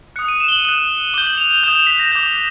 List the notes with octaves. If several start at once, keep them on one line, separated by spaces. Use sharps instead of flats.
D#6 F#6 C#7
D#7
E7
G7
F#7
D#6 F#6 F#7
D6 G6 G7
F#7
F7
F7
D#6 G6 E7
E7
B6
A#6
D6 G6